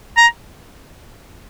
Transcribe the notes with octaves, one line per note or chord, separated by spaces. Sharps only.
A#5